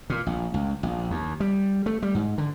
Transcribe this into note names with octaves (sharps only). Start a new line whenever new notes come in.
A#2
A#1
C#2
A#1
D#2
G3
A3
G3
G#2
D3